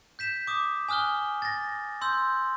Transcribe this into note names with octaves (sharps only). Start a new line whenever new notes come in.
G6 B6 E7
D6 D#6
G#5 D#6 F6 F#6 G7
A6 A#6
C6 E6 G6